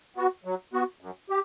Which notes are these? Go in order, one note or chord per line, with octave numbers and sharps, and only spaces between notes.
B3 F#4
F#3
B3 F#4
F#2
G4